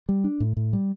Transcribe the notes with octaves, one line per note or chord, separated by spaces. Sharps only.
G3
D4
A2
A2
G3